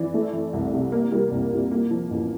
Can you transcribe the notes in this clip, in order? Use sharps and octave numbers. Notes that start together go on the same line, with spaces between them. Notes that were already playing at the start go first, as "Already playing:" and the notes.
Already playing: E3 D5
A3
E3
C2
C3
A#3 A#4
G3
C2
A#2
A#3
F3
A1